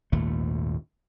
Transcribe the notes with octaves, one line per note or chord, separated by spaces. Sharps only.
G#1 D#2 A#2 A3